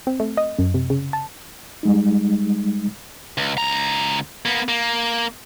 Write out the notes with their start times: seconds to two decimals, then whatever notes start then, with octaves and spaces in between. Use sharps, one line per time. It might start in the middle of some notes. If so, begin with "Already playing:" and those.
0.07 C4
0.20 A3
0.37 D#5
0.58 F#2
0.74 C3
0.90 C#3
1.13 A5
1.83 G3 G#3 D#4
3.38 C#2
3.58 C#2 A#5
4.46 A#3 B3
4.69 A#3